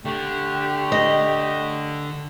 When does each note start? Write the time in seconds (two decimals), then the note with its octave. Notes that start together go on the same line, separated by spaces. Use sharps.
0.05 D3 A3 G4
0.92 D#5